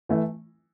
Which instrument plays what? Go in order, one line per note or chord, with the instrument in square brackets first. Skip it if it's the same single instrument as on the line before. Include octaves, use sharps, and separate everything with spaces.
[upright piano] E3 A3